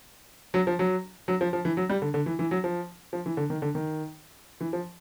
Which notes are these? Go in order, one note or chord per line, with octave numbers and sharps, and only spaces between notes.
F#3
F3
F#3
F#3
F3
F3
E3
F#3
G3
D3
D3
E3
E3
F#3
F3
F3
E3
D3
D#3
D3
D#3
E3
F3